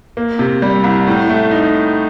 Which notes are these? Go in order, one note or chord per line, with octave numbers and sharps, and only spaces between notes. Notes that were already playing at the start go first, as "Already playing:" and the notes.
A#3
C3
G3
C2
A2
A3
D#4